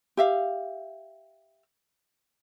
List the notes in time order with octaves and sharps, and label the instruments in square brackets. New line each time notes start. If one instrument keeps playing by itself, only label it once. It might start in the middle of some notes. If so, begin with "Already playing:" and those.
[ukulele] G4 E5 F5